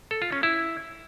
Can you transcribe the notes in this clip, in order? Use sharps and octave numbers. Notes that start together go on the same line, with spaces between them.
A4
F4
C#4
E4